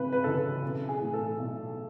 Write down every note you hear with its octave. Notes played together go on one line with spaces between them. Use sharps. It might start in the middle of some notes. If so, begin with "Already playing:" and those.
Already playing: G#1 C#3 E3 B4
B4
F#2 C#3 E3 A4
B1
G#4
A2 E3
A4
B1